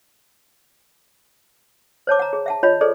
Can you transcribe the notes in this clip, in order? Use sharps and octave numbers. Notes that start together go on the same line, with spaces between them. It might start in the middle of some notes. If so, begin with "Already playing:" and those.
C5 C#5 A5 D6
F#5 A#5
G#4
E5 F#5 A5
F4 C#5 D#5 F#5 B5
G#4 A4 C5 D5